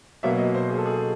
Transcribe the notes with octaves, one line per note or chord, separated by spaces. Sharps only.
B2 F#3 A#3 E5
D#5
C5
G#4
A4
G#4